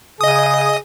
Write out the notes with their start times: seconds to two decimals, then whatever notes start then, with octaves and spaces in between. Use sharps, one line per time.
0.21 C#3 G#4 D#5 D#6